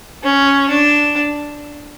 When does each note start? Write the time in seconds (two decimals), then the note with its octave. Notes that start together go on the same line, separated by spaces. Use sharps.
0.23 C#4
0.69 D4